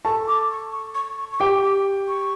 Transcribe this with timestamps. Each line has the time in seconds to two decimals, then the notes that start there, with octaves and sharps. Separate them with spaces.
0.05 A4 A5 C#6
0.28 D6
0.51 C#6
0.72 C#6
0.95 C#6
1.18 C#6
1.32 C#6
1.40 G4 G5 D6
1.62 D6
2.08 C#6